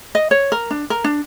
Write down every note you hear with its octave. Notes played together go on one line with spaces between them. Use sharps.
D#5
C#5
A#4
D4
A#4
D4